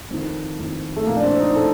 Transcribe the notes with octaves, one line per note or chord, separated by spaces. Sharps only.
F2 D#3
F2 D#3
A3
A#2 F3 A#3
D4
C4
D#4
A#2 A4